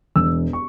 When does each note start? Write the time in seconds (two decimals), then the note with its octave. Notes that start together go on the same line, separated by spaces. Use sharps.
0.16 E1 E6
0.53 C#6